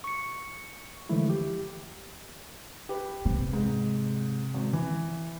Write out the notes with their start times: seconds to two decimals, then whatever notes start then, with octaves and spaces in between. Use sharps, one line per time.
0.04 C#6 C#7
1.09 D3 E3 F3 G#3 A3 E4
1.30 G4
2.89 G4 B4
3.25 C3
3.53 G#2
4.54 G#1
4.73 E3